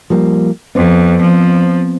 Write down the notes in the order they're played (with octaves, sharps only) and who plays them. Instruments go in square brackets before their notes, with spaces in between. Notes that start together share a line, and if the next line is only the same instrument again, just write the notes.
[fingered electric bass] F3 G3 A#3
[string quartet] F2 [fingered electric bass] B3 C4
[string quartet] F3